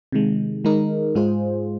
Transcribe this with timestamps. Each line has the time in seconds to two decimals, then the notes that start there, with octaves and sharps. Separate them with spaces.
0.12 C3 D#3 G#3
0.64 D#3 G#3 D#4 A#4
1.15 G#2 G#3 F4 G#4 C5